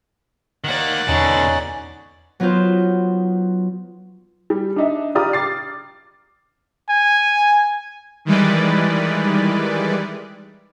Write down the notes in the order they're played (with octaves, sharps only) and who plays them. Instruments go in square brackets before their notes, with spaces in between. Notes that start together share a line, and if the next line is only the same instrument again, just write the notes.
[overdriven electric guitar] D#3 A#3 [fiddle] D5 F#5
[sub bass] E2 [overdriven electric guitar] B2 D3 [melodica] C#4 D#4 G#5
[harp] F#3 B3 D#4 F4 C5
[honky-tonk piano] G3
D4 D#4 E5
F4 G4 D5 A#5 D#6 F6
D6 A6 C7
[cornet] G#5
[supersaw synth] D#3 E3 G3 G#3 B4 D5